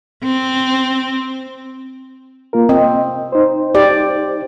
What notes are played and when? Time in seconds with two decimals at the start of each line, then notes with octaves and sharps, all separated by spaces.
0.24 C4
2.53 A#3 F4 A#4
2.69 C4 D#5
3.32 D#4 C5
3.75 G4 D5